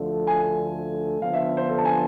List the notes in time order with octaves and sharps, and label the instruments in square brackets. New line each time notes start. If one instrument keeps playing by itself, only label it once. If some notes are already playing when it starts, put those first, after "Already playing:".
Already playing: [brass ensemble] D2 D3 F3 A3
[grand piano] G#5
[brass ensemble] D3 F3 B3 D4 [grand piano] F5
[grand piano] E5
C5
A4
A5
G#5